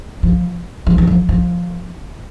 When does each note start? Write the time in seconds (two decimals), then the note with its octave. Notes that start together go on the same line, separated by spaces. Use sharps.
0.23 F3
0.87 F3
0.98 E3
1.07 F3
1.29 F3